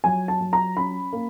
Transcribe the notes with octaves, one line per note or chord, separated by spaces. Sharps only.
F#3 G#5
A5
F#3
A#5
C#4 B5
A#3